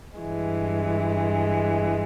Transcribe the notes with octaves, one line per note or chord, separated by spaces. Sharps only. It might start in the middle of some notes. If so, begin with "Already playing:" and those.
G2 E3 G#3